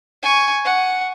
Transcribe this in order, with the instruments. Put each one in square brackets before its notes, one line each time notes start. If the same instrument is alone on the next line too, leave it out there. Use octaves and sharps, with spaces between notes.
[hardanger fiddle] G#5 C#6
F#5